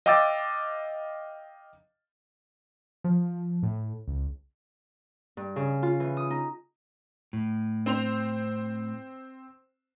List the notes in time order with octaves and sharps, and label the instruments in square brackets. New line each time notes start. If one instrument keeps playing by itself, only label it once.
[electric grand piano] D#5 F5 G5 D6 E6 A6
[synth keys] F3
A2
C#2
[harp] G2
C#3
F4
E3
D#6
D#4
[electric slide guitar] A2
[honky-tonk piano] C4 C5 F7